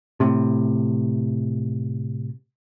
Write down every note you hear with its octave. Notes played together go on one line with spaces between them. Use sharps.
A2 C3